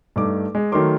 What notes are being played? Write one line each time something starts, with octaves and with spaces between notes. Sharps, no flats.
G2 A3 D#4 D6
G#3
D#3 F#3 A3 A#4 C6 D6